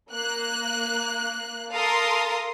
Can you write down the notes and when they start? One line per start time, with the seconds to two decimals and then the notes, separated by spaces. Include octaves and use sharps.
0.11 A#3 F#6
1.73 A4 A#4 F5 C6 D#6